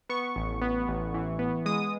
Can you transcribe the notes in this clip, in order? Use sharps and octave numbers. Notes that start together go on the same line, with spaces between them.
B3 C#6
A1
B3
A1
E3
B3
G#3 D#6